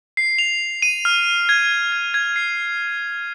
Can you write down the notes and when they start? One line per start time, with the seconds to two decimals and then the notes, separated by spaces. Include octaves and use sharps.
0.17 C7
0.38 F7
0.82 D#7
1.05 F6
1.49 G#6
1.92 G#6
2.14 G#6
2.36 C7